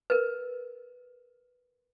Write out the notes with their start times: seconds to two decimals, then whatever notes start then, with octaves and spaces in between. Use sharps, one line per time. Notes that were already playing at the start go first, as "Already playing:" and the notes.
0.10 A#4 B4